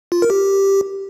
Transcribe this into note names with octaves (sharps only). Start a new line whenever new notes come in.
F4
A#4
G4